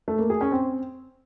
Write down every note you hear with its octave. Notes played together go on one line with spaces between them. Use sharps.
A3
A#3
G#4
C#4
C4